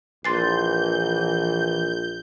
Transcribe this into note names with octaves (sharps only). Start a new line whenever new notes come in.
A#1 E3 C6 G6 A6 C7